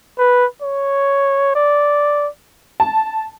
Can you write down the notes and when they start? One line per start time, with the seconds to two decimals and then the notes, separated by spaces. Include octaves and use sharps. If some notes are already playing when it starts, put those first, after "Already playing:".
0.19 B4
0.62 C#5
1.55 D5
2.80 A5